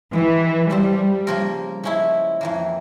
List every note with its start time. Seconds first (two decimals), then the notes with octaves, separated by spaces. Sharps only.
0.13 E3 G#3 E4 G4
0.70 F3 G3 C4 G4 C5
1.27 C#3 F3 A#3 F4 A#4
1.83 F3 G#3 C#4 E4
2.41 F2 E3 A#3